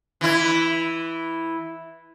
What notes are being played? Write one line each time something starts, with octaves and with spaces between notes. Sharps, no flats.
E3 E4